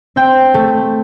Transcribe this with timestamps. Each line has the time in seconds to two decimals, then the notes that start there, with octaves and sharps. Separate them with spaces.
0.16 C4 G5
0.54 A3